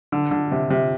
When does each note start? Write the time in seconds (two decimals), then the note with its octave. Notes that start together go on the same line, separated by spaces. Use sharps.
0.12 D3
0.31 D3
0.51 C3
0.70 C3